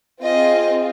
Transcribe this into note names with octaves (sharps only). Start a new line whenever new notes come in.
C4 F4 G#4 D#5